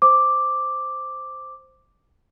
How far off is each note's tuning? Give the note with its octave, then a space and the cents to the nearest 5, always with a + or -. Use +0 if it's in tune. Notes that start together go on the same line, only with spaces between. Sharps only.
C5 +0 D6 +0